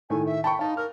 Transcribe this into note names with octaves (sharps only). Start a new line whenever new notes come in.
A2 D#3 A3 G#5
E5
G5 A5 B5 C#6
D#4 F5 A5
A#4 F6